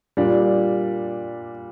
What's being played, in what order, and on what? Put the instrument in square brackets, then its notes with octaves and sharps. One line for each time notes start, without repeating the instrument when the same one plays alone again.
[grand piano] A#2 G3 D4